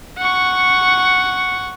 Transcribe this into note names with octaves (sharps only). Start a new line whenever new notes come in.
F#5 C#6